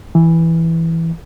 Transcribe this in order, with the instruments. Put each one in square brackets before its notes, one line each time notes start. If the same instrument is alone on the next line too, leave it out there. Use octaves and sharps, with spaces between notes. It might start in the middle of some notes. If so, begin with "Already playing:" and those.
[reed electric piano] E3